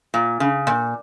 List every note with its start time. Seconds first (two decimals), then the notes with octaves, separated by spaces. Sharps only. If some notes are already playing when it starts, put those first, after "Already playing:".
0.14 A#2
0.40 C#3
0.67 A#2